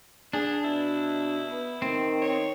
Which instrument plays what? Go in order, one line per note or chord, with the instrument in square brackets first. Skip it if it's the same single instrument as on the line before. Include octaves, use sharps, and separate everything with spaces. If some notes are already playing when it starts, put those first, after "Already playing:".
[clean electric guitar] D4 [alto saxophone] G#4
[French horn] B2 [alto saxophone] E4
[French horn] B3
[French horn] D#3 [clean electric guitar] C4
[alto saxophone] C#5